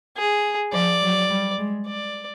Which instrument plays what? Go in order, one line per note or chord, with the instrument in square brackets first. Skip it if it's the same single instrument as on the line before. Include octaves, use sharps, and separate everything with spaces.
[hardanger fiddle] G#4
[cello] F3 [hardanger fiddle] D5
[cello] F#3
G3
G#3
[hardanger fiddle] D5